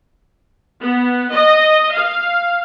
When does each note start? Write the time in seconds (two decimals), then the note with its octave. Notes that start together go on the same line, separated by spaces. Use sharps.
0.79 B3
1.32 D#5
1.94 F5